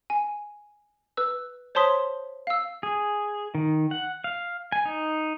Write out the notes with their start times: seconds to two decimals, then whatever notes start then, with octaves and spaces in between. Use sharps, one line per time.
0.10 G#5
1.17 B4 E6
1.75 C5 C#5 A5 C6 D#6 B6
2.47 F5 E6
2.83 G#4
3.55 D#3
3.91 F#5
4.24 F5
4.72 G#5
4.85 D#4